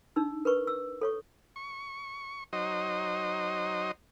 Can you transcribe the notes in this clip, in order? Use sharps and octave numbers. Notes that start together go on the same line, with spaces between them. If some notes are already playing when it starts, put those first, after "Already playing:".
D4 D#4 E6
A#4 B4 C#6
E6
A4 C#5 C#6
C#6
F#3 D#4 C5 D#5